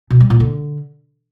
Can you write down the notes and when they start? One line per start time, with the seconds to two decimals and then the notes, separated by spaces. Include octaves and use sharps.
0.10 B2
0.20 G3
0.30 A#2
0.40 D3